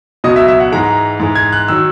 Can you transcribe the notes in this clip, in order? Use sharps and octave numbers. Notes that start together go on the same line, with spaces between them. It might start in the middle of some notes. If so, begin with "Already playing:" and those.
C#2 B2 F#3 D#5
E5
E5
F#5
G#2 E3 G#3 A#5
G#2 E3 G#3
G#6
F#6
D#3 F#3 E6